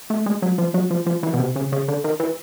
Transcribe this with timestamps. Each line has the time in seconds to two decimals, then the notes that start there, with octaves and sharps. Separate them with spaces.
0.10 A3
0.26 G#3
0.42 F#3
0.58 F3
0.74 F#3
0.91 F3
1.06 F3
1.23 E3
1.33 B2
1.40 C3
1.56 C#3
1.72 C#3
1.88 D3
2.04 D#3
2.20 E3